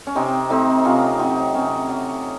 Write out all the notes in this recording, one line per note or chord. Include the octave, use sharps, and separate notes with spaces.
C#4
C3 C4 D#4
A3 C4 D#4
C3 C#4 F4
F#3 C4 D#4
C3 C#4
F#3